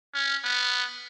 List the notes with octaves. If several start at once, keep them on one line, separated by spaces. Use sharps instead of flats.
C#4
B3